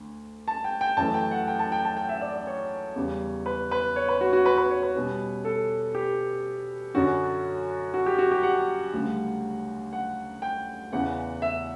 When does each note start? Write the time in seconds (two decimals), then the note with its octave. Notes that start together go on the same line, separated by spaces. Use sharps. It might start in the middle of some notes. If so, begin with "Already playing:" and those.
Already playing: D2
0.48 A5
0.64 G5
0.81 G5
0.97 F#2 E3 A3 A5
1.14 G5
1.31 F#5
1.48 G5
1.59 A5
1.72 G5
1.85 A5
1.97 G5
2.09 E5
2.21 D5
2.34 D5
2.47 C#5
2.96 E2 C#3 G3
3.46 B4
3.71 B4
3.96 C#5
4.08 B4
4.21 F#4
4.33 F#4
4.46 B4
4.58 B4
4.71 C#5
4.83 B4
4.95 B2 G3 C#4
5.45 A4
5.95 G4
6.94 F#2 D3 F#3 C#4 F#4
7.94 F#4
8.06 G4
8.18 F#4
8.31 G4
8.43 F#5
8.93 D2 C#3 G3
9.93 F#5
10.42 G5
10.92 E2 C#3 E3 F#5
11.42 E5